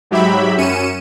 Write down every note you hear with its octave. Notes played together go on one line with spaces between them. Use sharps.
G#2 F#3 G4 E5 B5
F#2 C#4 C#7 D#7 E7